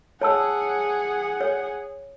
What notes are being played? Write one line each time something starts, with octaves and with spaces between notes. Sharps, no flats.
G#4 C#5 F#5 A5 E6
C#5